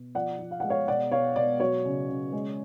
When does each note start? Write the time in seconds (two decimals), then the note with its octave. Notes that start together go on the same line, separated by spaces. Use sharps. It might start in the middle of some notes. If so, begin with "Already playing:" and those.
Already playing: B2
0.15 F3 D5 F#5
0.39 F3
0.51 F5
0.60 G#3 F#5
0.69 C#5 F5
0.88 B2 D5 F#5
1.11 B2 C#5 F5
1.36 B2 D5
1.60 F#3 C#5
1.85 C#3
2.09 C#3
2.32 G#3